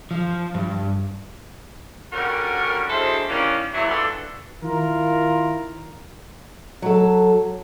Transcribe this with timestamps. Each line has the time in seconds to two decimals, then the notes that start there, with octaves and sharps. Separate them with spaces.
0.11 F3
0.54 G2
2.13 D3 G3 C#4 F#4 A#4
2.90 D2 G#3 E4 A4 C5
3.29 D#3 E3 G3 A#3 C#4
3.74 E2 A#2 E3 F#3 E4
3.88 E3 D4 F4 F#4 A4 B4
4.63 D#3 E4 F4 A#4
6.82 F#3 A4